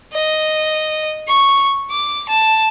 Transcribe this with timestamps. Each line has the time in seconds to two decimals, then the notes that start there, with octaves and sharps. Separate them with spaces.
0.13 D#5
1.28 C#6
1.91 D6
2.29 A5